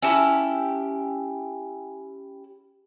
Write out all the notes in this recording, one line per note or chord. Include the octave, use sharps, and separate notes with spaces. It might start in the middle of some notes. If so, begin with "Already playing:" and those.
C#4 E4 G4 A5